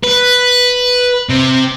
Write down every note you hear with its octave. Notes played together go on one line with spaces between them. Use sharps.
B4
C3